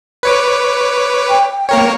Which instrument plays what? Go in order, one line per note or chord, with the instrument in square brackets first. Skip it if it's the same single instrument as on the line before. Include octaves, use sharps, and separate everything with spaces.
[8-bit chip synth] B4 C#5 D6
[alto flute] G5
[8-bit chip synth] A#3 A#4 C#5